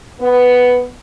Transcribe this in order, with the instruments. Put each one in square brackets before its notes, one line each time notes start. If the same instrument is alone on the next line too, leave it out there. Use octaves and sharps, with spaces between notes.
[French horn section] B3